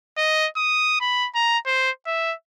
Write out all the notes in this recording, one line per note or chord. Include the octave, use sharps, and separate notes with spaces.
D#5
D#6
B5
A#5
C5
E5